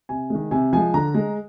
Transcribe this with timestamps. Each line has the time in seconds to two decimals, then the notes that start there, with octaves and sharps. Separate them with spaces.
0.09 C3 G#5
0.30 D#3 G#3
0.51 C3 G#5
0.73 F3 G#3 G#5
0.94 D3 A#5
1.14 G#3